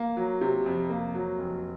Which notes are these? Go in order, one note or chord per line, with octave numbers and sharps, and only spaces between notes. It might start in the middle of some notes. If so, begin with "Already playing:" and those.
Already playing: A#3
F#3
C3
F2
A#3
F#3
F1